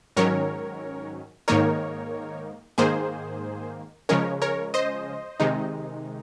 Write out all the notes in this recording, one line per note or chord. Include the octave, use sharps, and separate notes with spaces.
G#2 D#3 F#3 C#4 A#4 C#5
G#2 D#3 A#3 D#4 A#4 C#5
G#2 D#3 A#3 G#4 C5
C#3 F3 G#3 C#4 A#4 C#5
A#4 C#5
C5 D#5
C3 D#3 G#3 D#4